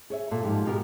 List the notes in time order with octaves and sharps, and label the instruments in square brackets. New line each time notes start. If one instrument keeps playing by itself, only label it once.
[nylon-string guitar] G#4 C#5 E5
A#2 A4
G#2 F3 G4
B2 D#4 G4 G#4 A#4